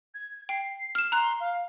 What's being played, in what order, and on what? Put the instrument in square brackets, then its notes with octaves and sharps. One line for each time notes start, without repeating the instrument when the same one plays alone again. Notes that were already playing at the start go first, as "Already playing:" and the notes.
[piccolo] G#6
[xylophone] G5 [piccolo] C7
[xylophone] F6 E7
[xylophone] A#5 F#6 [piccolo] C6
[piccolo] F5